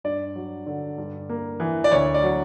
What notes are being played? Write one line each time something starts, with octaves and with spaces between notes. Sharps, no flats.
G2 D5
F#3
D3
G2
A#3
E3
D5
D2 C#5
D5
F#3